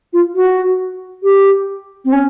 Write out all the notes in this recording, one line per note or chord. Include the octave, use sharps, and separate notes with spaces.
F4
F#4
G4
C4
C#4